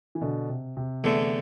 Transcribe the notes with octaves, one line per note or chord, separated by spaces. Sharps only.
E3
B2 D3
C3
C3
E2 D3 A3